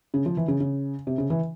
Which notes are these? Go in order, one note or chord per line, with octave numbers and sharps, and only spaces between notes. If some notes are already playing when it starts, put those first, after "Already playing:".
C#3
F3
E3
C#3
C#3
C3
C#3
E3